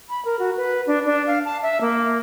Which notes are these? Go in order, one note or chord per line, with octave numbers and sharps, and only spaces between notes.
B5
A#4
F#4
B4
D4
D4
F5
A5
E5
A#3